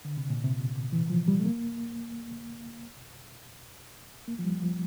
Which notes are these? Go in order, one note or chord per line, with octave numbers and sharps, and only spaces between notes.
D3
C3
A#2
C3
E3
F3
G3
A3
A#3
A#3
F3
G3
F3